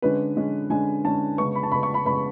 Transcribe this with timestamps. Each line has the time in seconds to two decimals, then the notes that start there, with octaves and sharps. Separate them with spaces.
0.02 D3 G#3 C#4 B4
0.37 D3 G#3 C#4
0.70 D3 G#3 C#4 G#5
1.05 D3 G#3 C#4 A5
1.38 C#3 G#3 B3 C#6
1.55 B5
1.63 A5
1.72 C#3 G#3 B3 B5
1.83 C#6
1.94 B5
2.05 C#3 G#3 B3 B5